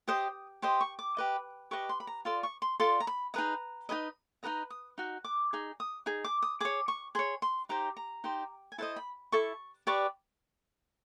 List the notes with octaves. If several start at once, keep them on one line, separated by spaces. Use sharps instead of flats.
G4 C5 D#5 D#6
G4 C5 D#5 C6
C#6
D6
G4 B4 D#5
G4 B4 D#5 C#6
C6
B5
A#5
F4 A4 D5 C6
C#6
C6
F4 A4 D5 C6
A#5
B5
D#4 G#4 B4 D#5 A#5
D#4 G#4 B4 D#5
D#4 F#4 B4 D#5 A#5
D#6
D#4 F#4
D6
D#4 G#4
D#6
D#4 G#4
D6
D#6
G#4 C#5 D6
C#6
G#4 C#5 C6
C6
D#4 G4 C5 A#5
A#5
D#4 G4 C5
G#5
E4 A4 C5 D#5 A5
B5
E4 A4 C#6
G4 B4 D5 C#6